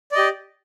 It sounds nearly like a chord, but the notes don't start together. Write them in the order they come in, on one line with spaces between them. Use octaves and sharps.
D5 D#5 G4